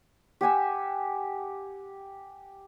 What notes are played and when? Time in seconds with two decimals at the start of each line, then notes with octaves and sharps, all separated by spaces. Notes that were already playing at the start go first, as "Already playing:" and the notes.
0.41 G4 F#5 G#5 E6